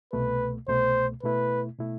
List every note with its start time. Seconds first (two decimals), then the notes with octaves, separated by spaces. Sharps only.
0.13 C2 B2 A3 B4
0.68 C2 B2 A3 C5
1.23 B2 A3 E4 B4
1.79 B2 A3 E4